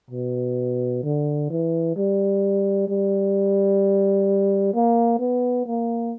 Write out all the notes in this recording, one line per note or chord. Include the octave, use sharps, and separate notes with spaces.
B2
D3
E3
G3
G3
A#3
B3
A#3